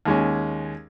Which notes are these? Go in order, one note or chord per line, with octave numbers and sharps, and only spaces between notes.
D#2 G#3 C#4